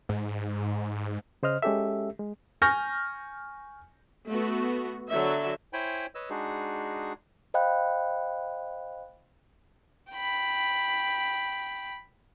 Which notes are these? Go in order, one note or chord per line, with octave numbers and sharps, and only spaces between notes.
G#2
C#3 C5 D#5 F6
G#3 C#4 G4 A4 E5
G#3
G#5 C#6 F6 G6 A#6
A3 B3 F#4
D3 F#3 F#4 E5
E4 C5 C#5 G5 G#5 B5
B4 C#5 D#5 E6
G#3 D4 D#4 F#4 G#4
C5 D#5 F5 G5 B5 F#6
G5 B5